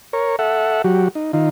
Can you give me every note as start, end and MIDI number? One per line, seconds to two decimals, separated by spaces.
0.13 0.36 70
0.13 0.36 73
0.39 0.82 69
0.39 0.82 76
0.39 0.82 78
0.84 1.08 54
0.84 1.08 66
0.84 1.08 67
1.15 1.32 63
1.33 1.49 51
1.33 1.49 63
1.33 1.49 65